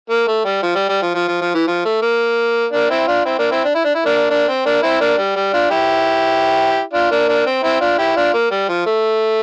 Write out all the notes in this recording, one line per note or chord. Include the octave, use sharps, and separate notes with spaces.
A#3
A3
G3
F3
G3
G3
F3
F3
F3
F3
E3
F3
A3
A#3
A#3 D4
C4 E4
D4 F4
C4 E4
A#3 D4
C4 E4
D4
E4
D4
E4
A#3 D4
A#3 D4
C4
A#3 D4
C4 E4
A#3 D4
G3
G3
D4 F4
E4 G4
D4 F4
A#3 D4
A#3 D4
C4
C4 E4
D4 F4
E4 G4
D4 F4
A#3
G3
F3
A3